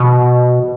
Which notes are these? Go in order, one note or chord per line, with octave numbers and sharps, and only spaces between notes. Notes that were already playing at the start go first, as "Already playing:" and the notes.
Already playing: B2